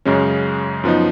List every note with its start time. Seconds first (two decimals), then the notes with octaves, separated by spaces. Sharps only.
0.05 F#2 C#3 G#3 C#4
0.84 F#2 F3 B3 D#4